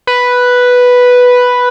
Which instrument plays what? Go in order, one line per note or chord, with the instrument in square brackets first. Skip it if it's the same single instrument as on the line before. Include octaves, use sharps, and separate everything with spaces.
[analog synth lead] B4